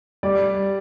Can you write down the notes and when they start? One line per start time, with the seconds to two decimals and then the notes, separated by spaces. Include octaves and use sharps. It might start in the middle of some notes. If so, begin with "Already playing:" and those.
0.23 G3 D5